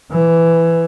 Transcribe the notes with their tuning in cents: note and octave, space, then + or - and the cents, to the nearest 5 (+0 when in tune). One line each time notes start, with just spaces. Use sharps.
E3 +10